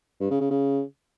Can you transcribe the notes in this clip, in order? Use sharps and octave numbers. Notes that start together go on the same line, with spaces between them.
G2
C#3
C#3
C#3